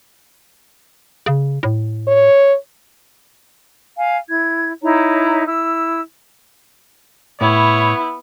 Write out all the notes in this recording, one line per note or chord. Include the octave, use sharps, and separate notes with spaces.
C#3
A2
C#5
F5 G#5
E4 G#6
D#4 E4 C#5 A#5
E4 E6
A2 B3 E4 C#5